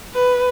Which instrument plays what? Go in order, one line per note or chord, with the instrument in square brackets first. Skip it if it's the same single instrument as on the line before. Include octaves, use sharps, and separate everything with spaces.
[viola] B4